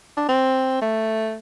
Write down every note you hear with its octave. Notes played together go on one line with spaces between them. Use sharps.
D4
C4
A3